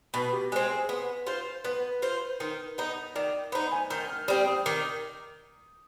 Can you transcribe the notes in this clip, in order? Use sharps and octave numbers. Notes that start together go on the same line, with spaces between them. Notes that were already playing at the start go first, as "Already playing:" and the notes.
B2 B4
G4
G#3 C4 G#4
G#4
B3 B4
F4 C5
B3 B4
F4 C5
D#3
B3 D#4
D#3 D5
B3 D#4 C5
G#5
D#3 G6
F6
G3 C4 D#6
D#6
D#3 D6